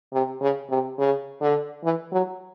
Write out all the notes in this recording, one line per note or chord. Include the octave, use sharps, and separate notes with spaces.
C3
C#3
C3
C#3
D3
E3
F#3